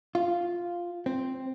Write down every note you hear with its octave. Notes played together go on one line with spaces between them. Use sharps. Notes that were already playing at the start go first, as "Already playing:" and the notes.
F4
C4